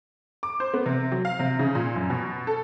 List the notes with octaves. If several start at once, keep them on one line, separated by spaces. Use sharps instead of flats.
D6
C5
B3
C3
F#3
F5
C3
C#3
A#2
F#2
B2
A4